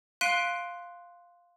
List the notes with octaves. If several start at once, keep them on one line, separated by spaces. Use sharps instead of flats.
F5 C6 F#6 B6 D7 D#7